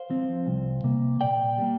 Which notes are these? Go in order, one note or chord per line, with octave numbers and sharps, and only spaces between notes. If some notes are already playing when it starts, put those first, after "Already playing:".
Already playing: C5 F5
F3 C4
C2
C3 A#3
A#2 D5 G5
G3 A#3